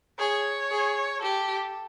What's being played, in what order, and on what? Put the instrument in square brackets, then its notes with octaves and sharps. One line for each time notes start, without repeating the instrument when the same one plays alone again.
[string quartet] G#4 [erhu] C#5
[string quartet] G#4
[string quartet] G4 [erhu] A4